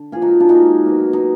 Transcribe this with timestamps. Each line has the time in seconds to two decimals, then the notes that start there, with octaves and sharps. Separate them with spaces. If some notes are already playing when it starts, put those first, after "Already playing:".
Already playing: D3
0.12 A#2 F3 A#3 F4 G#4
0.22 D#4 F#4
0.40 D4 F4
0.49 G#2 F3 A#3 D#4 F#4
0.86 B2 F#3 A#3
1.13 D#4